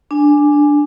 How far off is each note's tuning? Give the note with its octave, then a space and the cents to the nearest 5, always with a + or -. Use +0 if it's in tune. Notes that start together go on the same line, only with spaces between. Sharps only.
D4 +0 G#5 +0